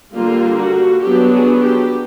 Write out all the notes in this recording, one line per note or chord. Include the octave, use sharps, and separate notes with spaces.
D3 G3 A#3 F4
F#4
F#3 B3 D4 G4
G#4
G4